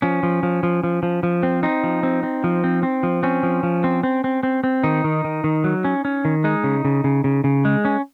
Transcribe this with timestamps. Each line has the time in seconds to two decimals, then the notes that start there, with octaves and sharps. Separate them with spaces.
0.02 F3 C#4
0.23 F3
0.43 F3
0.63 F3
0.84 F3
1.03 F3
1.23 F3
1.43 C4
1.63 C4 D#4
1.84 F3
2.03 C4
2.23 C4
2.44 F3
2.64 C4
2.83 C4
3.03 F3
3.23 C4 C#4
3.43 F3
3.63 F3
3.84 C4
4.03 C4
4.24 C4
4.43 C4
4.64 C4
4.84 D#3 D#4
5.04 D#3
5.24 D#3
5.44 D#3
5.64 F#3
5.84 C#4
6.05 C#4
6.25 D#3
6.44 G#3 D#4
6.64 C#3
6.85 C#3
7.04 C#3
7.24 C#3
7.44 C#3
7.65 G#3
7.85 C#4